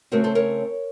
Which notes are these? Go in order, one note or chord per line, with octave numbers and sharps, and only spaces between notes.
C#3 A3 C4 F#4 A#4
A4 C5
A#4 C#5